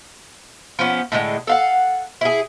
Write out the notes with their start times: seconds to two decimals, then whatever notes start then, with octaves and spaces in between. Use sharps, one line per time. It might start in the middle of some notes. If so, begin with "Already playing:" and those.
0.79 F3 B3 C#4
1.12 A2 D3 G#3
1.47 A4 F5 F#5
2.21 E4 G#4